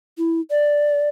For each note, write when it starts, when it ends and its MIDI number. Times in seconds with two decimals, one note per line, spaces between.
0.18 0.40 64
0.51 1.09 74